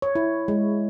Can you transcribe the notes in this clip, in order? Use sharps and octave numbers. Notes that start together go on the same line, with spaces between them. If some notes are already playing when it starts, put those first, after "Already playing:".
C#5
E4
G#3